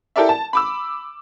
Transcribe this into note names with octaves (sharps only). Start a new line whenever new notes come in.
E4 G4 A4 A#4 D5 E5
A5
B5 D6 E6